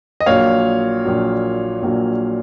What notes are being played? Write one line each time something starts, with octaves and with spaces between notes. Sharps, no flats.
D#5
A#1 A#2 F#3 C#5 F5
A#1 A#2 F#3
A#1 A#2 F#3